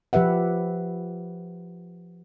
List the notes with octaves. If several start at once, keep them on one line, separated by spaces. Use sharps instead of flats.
F3 G4 B4 E5 F#5